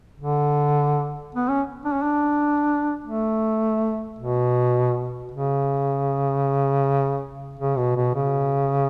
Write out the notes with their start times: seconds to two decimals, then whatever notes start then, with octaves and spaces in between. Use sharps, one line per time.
0.20 D3
1.35 B3
1.49 C#4
1.85 D4
1.93 C#4
2.03 D4
3.04 A3
4.19 B2
5.31 C#3
7.59 C#3
7.77 B2
7.96 B2
8.15 C#3